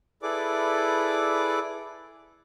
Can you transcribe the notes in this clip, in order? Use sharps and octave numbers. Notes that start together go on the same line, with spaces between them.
E4 G#4 A4 B4 D5 D6